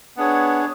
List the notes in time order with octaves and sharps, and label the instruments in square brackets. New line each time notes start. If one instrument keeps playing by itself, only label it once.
[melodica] B3 D4 G#4 C#5